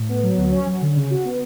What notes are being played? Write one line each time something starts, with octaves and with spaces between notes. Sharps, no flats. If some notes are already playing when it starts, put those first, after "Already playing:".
Already playing: A2
B3
F#3
D2
C#4
F#3
D3
C#3
F#4
B3